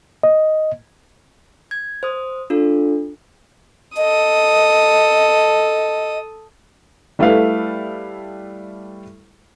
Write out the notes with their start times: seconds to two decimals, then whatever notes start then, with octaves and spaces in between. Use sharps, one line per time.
0.23 D#5
1.71 G#6
2.03 C5 D#6
2.50 D4 F4 A4
3.97 A4 D#5 D#6
7.19 G3 A3 E4 A4 B4 F5